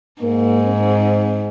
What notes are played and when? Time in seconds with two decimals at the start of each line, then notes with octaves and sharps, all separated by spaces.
0.22 G#2 A#3
0.66 C4